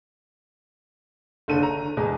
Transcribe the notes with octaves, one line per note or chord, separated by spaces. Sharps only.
F#1 D3 A4 D#7
A#5
E2 B2 G#3